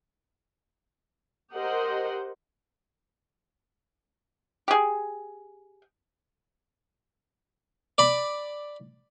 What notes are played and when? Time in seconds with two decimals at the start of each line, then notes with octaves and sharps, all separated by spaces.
1.54 G4 A#4 C5 D#5 F#5
4.68 G4 G#4
7.98 D5 B5